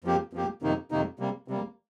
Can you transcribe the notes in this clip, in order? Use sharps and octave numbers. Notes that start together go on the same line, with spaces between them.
F2 F3 A#3 G4
F2 F3 A#3 G4
F2 C3 D#3 A#3 D#4
F2 C3 D#3 A#3 D#4
C3 G3 A#3
C3 G3 A#3